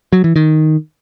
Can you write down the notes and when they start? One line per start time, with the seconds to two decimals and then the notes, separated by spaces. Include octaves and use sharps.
0.12 F#3
0.24 E3
0.36 D#3